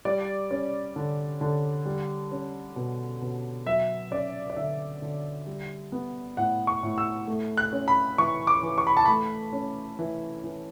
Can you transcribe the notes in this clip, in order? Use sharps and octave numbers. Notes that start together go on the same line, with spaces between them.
G3 D5
C#4
D3
D3
G3
C#4
B2
B2
F#3 E5
C#4 D5
D5
D3 E5
D3
G3
B3
A2 F#5
C#6
A2
E6
A3
F#6
C#4
B5
E3 C#6
D6
E3
C#6
B5
A5
A3 B5
C#4
E3
E3